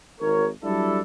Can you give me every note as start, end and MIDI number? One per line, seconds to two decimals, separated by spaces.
0.19 0.47 32
0.19 0.47 70
0.19 0.47 73
0.62 1.00 54
0.62 1.00 55
0.62 1.00 62
0.62 1.00 64
0.62 1.00 69